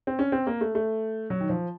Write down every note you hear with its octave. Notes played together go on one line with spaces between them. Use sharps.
C4
C#4
C4
A#3
A3
A3
F#3
D#3
F3